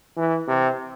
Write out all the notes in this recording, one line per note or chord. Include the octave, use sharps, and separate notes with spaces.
E3
C3